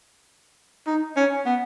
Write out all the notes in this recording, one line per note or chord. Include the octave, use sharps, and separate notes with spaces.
D#4
C#4
B3